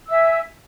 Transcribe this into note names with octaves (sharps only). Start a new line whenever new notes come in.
E5 G#5 E6